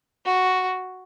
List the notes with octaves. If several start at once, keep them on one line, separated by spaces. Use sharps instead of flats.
F#4